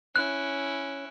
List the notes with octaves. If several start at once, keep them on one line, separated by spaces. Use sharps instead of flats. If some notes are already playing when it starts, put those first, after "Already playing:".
C#4 E4 F#6